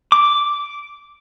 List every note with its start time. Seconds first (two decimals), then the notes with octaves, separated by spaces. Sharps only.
0.12 D6